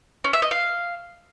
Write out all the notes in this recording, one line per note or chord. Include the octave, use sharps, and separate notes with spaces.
C#4
E5
D#5
F5